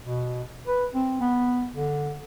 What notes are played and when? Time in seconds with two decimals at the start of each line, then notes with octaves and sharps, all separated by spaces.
0.03 B2
0.67 B4
0.94 C4
1.21 B3
1.75 D3